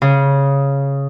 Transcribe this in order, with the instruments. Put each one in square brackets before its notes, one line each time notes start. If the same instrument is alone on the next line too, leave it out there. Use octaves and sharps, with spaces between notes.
[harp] C#3